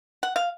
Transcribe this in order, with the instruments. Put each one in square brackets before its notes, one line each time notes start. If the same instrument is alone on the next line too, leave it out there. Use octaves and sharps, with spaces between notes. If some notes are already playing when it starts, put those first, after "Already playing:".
[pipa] F#5
F5